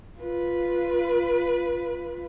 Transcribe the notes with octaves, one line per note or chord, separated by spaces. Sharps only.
F4 B4